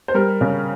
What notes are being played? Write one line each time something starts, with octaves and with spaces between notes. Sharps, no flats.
C5
G3 A#4
C#3